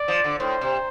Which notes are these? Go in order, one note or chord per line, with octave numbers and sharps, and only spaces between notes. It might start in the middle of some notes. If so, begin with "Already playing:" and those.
Already playing: D5
F3
D3
A2 C5
C3